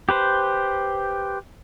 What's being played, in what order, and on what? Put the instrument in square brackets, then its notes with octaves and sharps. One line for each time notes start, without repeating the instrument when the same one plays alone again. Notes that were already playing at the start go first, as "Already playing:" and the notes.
[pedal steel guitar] G4 B4 C5